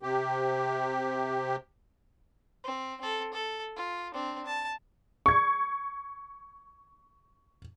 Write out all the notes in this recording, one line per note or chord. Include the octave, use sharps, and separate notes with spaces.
C3 G4
C4
C4 A4
A4
F4
C4 D4
A5
C#6 G#6